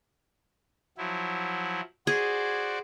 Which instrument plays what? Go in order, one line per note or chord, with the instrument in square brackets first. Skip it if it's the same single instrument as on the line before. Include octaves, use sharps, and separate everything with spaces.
[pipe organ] F3 F#3 E4
[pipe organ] F#4 C5 D5 [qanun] G#4